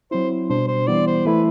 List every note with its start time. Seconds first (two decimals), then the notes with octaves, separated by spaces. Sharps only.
0.11 F#3 C4 E4 C5
0.50 B2 G3 D4 C5
0.68 C5
0.87 E3 G3 B3 E4 D5
1.07 C5
1.25 E3 A3 E4 B4